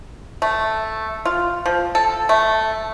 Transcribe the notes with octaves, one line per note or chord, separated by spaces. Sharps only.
A3
F4
F3
A4
A3